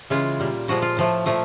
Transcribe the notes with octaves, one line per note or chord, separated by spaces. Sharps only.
C#3 E3 G#3 F4
A#2 G3
A#2 F3 G#3 F#4
F4
A2 F3 A3
A#2 F3 A3